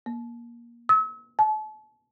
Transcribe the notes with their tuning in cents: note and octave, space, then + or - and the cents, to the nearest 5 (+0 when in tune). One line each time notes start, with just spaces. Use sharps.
A#3 +20
E6 -40
A5 -40